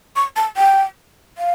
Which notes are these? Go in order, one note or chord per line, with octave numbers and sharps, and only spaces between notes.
C#6
A5
G5
F5